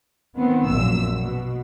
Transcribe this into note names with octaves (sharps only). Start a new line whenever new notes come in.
D#3 B3 C4
A#1 F#2 A#2 E6
B2